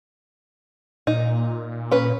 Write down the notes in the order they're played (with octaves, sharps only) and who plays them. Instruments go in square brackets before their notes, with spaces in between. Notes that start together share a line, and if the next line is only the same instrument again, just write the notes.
[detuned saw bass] A#2 [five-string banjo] D#4
[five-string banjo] C#4 B4